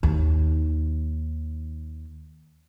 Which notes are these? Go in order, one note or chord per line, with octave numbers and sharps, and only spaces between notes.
D#2 D#3